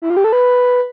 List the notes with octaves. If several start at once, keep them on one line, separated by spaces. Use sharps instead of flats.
E4
F4
G4
A4
B4